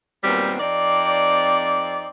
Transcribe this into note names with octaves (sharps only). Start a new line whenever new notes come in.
A#2 D#3 F#3 G3 B3 C4
F2 C4 D#4 D5